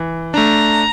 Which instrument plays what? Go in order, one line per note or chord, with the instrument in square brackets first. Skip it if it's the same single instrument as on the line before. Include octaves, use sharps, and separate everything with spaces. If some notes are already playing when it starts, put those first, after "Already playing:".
Already playing: [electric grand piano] E3
[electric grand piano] A3 D4 [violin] A#5